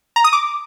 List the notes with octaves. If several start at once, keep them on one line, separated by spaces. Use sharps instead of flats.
A#5
D#6
D6